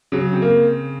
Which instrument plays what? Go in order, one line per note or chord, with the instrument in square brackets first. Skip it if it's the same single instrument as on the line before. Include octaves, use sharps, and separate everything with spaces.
[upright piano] C#3 [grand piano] F#3
[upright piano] C4
[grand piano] A#3